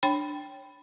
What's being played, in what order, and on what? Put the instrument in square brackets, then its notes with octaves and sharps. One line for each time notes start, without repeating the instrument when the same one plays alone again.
[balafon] D4 C#5 G5 B5